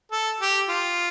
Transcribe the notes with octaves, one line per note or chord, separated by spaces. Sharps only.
A4
G4
F4